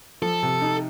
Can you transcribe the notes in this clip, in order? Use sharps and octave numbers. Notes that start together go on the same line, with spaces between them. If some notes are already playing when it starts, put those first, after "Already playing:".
F3 A4
C3
D#4